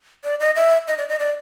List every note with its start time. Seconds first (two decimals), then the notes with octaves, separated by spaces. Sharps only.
0.24 D5
0.40 D#5
0.56 E5
0.88 D#5
0.98 D5
1.09 D#5
1.19 D5